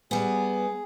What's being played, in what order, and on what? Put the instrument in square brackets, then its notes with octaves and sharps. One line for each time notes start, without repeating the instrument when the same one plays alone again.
[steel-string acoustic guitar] G3 B3 [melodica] G#4